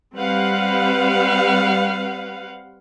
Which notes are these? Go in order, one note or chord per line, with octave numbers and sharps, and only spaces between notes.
G3 C4 B4 F5 F#5